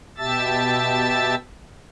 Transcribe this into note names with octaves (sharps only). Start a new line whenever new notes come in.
B2 G4 E5 A5 E6 A6